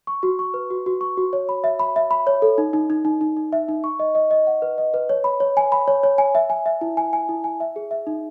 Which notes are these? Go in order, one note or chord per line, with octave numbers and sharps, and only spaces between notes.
C#6
F#4
C#6
B4
F#4
F#4
C#6
F#4
C#5
B5
E5
B5
E5
B5
C#5
A4
D#4
D#4
D#4
D#4
D#4
D#4
E5
D#4
C#6
D#5
D#5
D#5
F#5
B4
D#5
B4
C#5
B5
C#5
G#5
B5
C#5
C#5
G#5
E5
G#5
E5
E4
G#5
G#5
E4
G#5
E5
G#4
E5
D#4